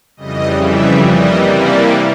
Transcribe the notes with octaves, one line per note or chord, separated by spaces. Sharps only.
F2 C#3 E3 G3 D#5
E5
C3 E3 G3 A#3 D#5
D5